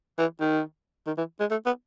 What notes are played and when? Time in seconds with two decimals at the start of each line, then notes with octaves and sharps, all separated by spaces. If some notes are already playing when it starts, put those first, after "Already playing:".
0.18 E3
0.41 D#3
1.07 D#3
1.18 E3
1.40 G#3
1.51 A3
1.66 B3